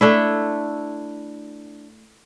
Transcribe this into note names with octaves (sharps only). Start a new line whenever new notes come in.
A3 D4 E4